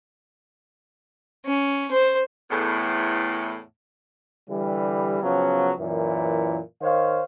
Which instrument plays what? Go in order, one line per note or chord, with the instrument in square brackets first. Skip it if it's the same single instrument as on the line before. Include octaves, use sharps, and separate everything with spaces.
[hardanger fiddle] C#4
C5
[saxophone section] E2 A2
[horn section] D3 E3 G3
C#3 F3 F#3 B3 C#4
F#2 A#2 E3
D#3 C5 C#5 F5